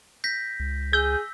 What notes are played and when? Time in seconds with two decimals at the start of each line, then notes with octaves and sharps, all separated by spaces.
0.24 G6 A#6 B6
0.60 C#2
0.93 G#4 E6 G6